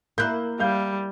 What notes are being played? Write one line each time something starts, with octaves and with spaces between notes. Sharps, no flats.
A#3 E4 F#6 G6
G3 F5 G6